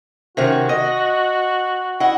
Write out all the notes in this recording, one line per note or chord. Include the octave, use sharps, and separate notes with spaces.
C3 D#3 C#4 F#4
D#5
E4 D#5 F#5